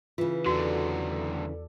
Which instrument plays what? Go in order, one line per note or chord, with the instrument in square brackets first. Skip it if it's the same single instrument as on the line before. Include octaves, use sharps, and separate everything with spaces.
[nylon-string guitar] C#3 E3 [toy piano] F4
[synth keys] E2 A4 D5 [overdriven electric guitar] D3 F#3 [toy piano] F#4